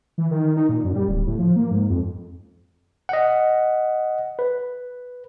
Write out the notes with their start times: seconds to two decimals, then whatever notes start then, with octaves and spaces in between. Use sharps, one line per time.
0.18 E3
0.31 D#3
0.57 D#4
0.69 A#2
0.84 F#2
0.95 G3
1.08 D1
1.27 A2
1.39 F3
1.56 A#3
1.71 G#2
1.90 F2
3.09 D#5 F#5
4.39 B4